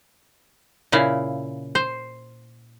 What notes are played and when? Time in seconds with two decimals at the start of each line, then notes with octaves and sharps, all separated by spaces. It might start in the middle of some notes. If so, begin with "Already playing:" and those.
0.92 A#2 C#3 E4 F5
1.75 C5